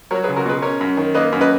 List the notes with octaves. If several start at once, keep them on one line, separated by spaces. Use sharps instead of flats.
F#3 A#4 C#5
G#4 B4
C#2
F#4 A#4
B2 G#4 B4
C#4 A#4 C#5
F#2
D#3
A#3 B4 D#5
F#2
B4 D#5